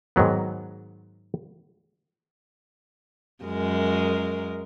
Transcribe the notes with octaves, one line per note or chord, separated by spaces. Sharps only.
G#2 D#3 F#3 B3
F#2 G#3 A#4